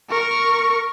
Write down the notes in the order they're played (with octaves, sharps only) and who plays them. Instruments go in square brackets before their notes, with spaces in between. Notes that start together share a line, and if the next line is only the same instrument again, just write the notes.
[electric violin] A#4 C#6